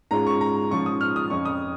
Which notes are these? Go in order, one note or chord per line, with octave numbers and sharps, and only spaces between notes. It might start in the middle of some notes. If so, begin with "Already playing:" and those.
G#2 G#3 C#4 F4 A#5
C#6
A#5
G#2 F3 C#4 F4 C#6
D#6
F6
D#6
F2 F3 C#4 C#6
D#6